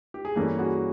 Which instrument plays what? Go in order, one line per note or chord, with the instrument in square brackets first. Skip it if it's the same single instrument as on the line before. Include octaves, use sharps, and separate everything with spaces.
[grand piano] G4
G#4
G2 E3 G3 A#3 C#4 G4 A4
F#4 G#4